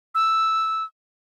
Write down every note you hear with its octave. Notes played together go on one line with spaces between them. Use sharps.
E6